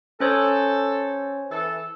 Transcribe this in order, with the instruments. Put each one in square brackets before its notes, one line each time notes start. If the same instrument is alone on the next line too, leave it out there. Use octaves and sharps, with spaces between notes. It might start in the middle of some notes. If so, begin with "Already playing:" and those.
[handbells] C#4 C5 C#5 [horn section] A4
[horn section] E3 A4